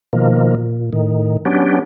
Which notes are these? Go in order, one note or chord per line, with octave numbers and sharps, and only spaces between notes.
B2 D#3 F3 A#3
A#2
A2 D#3
F#3 B3 C#4 D4 G4